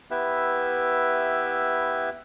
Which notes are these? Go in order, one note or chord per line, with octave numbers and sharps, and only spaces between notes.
B3 E4 G4 B4 E5